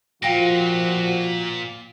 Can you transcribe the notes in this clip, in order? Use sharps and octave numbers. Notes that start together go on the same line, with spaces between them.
A#2 F3 F#4 F5 G5 A#6